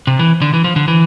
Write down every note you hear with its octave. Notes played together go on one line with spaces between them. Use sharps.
C3
E3
D3
E3
F3
D3
E3